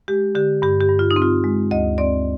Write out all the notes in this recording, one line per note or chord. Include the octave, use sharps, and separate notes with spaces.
G#3 G4
D3 G4
G2 G4
G4
G2
F4
D#4
C4
F4
G#3
D2 D#5
C4 D5